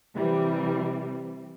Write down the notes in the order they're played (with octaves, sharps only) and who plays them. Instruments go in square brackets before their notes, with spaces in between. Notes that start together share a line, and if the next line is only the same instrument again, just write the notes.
[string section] C3 E3 G3